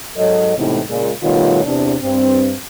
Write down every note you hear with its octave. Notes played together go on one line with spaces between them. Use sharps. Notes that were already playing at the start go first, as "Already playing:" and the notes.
G#2 F#3 A4 C#5 D#5
A2 C3 E3 G#3 B3 D#4
A#2 C#3 G#3
B2 D#3 G3 A3 F4 C#5
E2 C3 D4
G2 C4